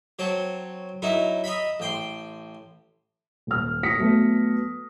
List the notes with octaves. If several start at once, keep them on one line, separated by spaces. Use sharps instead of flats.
F#3 C4 C#5 A5
F#3 D#4 E4 A#4
D#5 E5 A#5 B5
A1 G5 C6
D#1 F6
D#6 A#6 B6 C#7
F#3 A3 B3